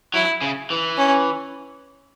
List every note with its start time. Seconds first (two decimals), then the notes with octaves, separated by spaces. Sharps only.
0.14 F#3 E4
0.41 C#3
0.70 E3
0.97 C#4